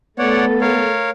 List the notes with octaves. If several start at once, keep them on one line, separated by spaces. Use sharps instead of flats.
A3 B3 A4 C#5 D5 F#5
A#4 C#5 F5